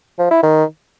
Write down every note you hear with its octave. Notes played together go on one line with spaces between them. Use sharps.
F3
E4
D#3